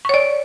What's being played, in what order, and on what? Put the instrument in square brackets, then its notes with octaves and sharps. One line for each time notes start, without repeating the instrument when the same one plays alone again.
[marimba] C#6
C#5
D5